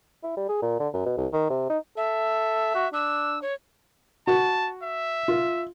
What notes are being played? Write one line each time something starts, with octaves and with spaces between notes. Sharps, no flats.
E4
G3
G#4
A#2
D3
F#2
B2
C2
D#3
C3
D#4
A4 E5
F#4
D4 E6
C#5
F#4 A5
E5
F4